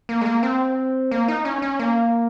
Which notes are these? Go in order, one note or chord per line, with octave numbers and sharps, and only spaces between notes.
A#3
G#3
A#3
C4
A#3
D#4
C#4
C#4
A#3